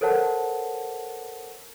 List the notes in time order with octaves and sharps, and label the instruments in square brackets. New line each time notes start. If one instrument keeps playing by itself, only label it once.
[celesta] A4 A#4 C5 C#5 F#5 A5